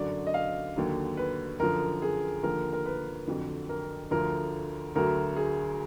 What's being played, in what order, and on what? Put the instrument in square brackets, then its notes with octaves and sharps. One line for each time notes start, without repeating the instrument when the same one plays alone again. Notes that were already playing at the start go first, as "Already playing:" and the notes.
Already playing: [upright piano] F#2 D3 F#3 D5
D#5
F5
D#2 D3 F#3
B4
F#2 D3 F3 A#4
G#4
D#2 D3 F3 A#4
A#4
B4
F2 D3 F#3
A#4
D2 D3 F3 A#4
D2 D3 F#3 A#4
G#4